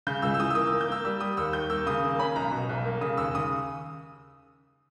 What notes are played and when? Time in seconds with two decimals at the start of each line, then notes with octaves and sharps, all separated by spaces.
0.07 C#3 G6
0.22 C#2 E6
0.34 E6
0.39 E3 D#6
0.50 E6
0.55 A#3 D#6
0.67 E6
0.72 A#3
0.81 G6
0.88 A#3 E6
1.04 G3 E6
1.20 G3 D#6
1.37 D#2 E6
1.53 D#2 G6
1.70 A#3 E6
1.86 C#3 D#6
2.04 A#3
2.19 C#4 B5
2.36 B1 A#5
2.52 B2
2.69 B1
2.85 A#3
3.01 C#3 D#6
3.17 D#2 E6
3.34 C#3 D#6